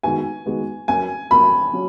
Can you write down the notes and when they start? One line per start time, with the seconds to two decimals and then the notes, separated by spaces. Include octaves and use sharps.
0.03 D#3 G#3 B3 F#4 G#5
0.46 D#3 G#3 B3 F#4
0.88 F#3 C#4 F#4 A#4 G#5
1.30 F#3 C#4 F#4 A#4 B5
1.73 F#3 C#4 F#4